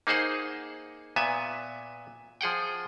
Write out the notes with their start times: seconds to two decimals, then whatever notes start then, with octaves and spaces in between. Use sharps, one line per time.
0.07 A#3 D#4 G#4 C5 F#5
1.16 A#2 B3 E5 G#5
2.41 F3 G#4 F#5 G5